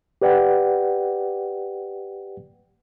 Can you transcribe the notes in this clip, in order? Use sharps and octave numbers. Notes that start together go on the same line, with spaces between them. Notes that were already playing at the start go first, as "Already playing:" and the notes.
G4 B4 D5 F#5 G5